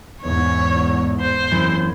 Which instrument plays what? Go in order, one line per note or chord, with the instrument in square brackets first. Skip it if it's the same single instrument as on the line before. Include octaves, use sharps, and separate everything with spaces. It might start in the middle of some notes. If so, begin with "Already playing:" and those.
[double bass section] E2 G#2 [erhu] C#5
[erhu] C5
[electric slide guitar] F#2 E3